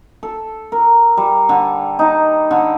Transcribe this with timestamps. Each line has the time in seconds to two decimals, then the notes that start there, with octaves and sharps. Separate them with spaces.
0.23 A4
0.72 A#4
1.17 G3
1.49 D3
1.99 D#4
2.51 D3